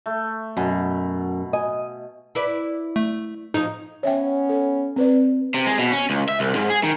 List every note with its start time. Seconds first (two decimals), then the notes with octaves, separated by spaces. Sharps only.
0.06 A3
0.57 F#2 B2
1.53 D#5 G#5
2.35 E4 B4 D5
2.96 A3
3.54 F3 D#4 C#5 D#5
4.03 B3 C#4 C#5 E5 G5
4.49 A4
4.96 C4 B4 D5
5.54 C3
5.67 G#3
5.79 B2
5.92 C#4
6.10 C#2
6.28 E5
6.40 C2
6.55 G#2
6.70 G#4
6.83 D#3